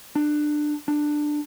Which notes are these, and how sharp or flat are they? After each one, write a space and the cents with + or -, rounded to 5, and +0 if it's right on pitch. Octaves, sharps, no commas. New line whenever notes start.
D4 +20
D4 +15